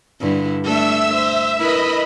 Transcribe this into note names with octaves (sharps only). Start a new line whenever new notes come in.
G2 D3 E4
A3 D4 A4 E5 E6
C5
E4 A#4 B4 D#5 B5